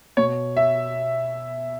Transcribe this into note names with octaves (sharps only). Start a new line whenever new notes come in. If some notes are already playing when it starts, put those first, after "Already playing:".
B2 C#5
E5